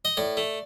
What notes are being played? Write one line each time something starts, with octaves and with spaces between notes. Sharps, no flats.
D#5
A2 D5
A3